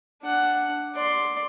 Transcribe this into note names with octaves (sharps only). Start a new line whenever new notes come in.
D4 F#5
D5 C6